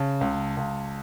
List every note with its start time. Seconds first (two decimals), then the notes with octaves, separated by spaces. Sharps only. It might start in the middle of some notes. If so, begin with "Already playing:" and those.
Already playing: C#3 A5
0.21 C#2
0.57 C#2